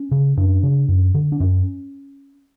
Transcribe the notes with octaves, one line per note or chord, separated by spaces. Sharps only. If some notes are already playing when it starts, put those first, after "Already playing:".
Already playing: C#4
C#3
F#2 D4
C#3
F#2
D3
D4
F#2 C#4